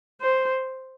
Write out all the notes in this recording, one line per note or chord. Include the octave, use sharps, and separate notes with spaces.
C5